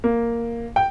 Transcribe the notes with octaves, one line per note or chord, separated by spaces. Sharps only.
A#3
G5